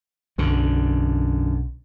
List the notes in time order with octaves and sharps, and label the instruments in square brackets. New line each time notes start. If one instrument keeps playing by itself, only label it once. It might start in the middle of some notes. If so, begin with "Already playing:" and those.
[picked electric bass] B1 [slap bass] F#2 D3